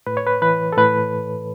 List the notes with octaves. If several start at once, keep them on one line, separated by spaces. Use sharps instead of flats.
A2 B4
C#5
B4
E3 B4
A4
A2 B4